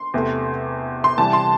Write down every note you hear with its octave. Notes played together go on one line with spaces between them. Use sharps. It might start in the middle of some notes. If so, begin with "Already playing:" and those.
Already playing: C6
E2 C3 A3
C6
C3 E3 G3 A5
C6